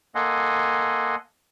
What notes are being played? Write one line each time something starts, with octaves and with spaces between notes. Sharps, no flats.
A#3 A4 D#5 F#5 G#5 C6